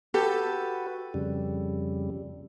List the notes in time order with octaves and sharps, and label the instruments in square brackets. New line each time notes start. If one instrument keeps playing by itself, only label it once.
[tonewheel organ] F#4 B4 [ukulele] G4 [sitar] A4
[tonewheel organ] F2 C#3 G3